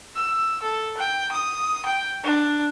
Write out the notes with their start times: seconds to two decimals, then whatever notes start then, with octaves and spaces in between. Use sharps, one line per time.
0.16 E6
0.62 A4
0.97 G5
1.32 D#6
1.85 G5
2.23 D4